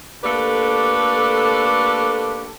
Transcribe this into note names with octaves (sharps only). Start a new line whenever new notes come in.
A3 A#3 D4 G4 A4 B4